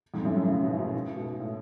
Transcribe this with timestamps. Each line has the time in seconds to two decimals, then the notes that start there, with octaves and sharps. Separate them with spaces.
0.14 F2 G#2
0.25 F#2 A2
0.36 F#2 A2
0.47 A2 C#3
0.64 G#2 B2
0.78 G#2 B2
1.16 G#2 B2
1.40 A2